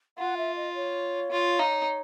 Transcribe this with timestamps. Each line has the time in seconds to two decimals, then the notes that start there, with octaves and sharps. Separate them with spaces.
0.18 F4 F#5
0.37 E5
0.56 D#5
0.75 C#5
1.31 F4
1.59 D#4